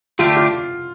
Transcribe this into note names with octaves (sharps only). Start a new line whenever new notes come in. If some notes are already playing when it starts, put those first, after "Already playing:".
D3 A3 D4 F4 G4
F4